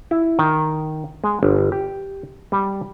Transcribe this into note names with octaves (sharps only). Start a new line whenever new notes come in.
E4
D#3
G#3
G1
G4
G3